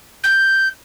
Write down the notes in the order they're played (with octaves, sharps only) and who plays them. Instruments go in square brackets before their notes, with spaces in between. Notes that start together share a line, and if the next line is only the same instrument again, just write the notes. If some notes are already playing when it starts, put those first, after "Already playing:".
[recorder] G6